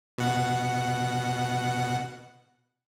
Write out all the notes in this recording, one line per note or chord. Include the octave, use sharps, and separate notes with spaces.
B2 F#5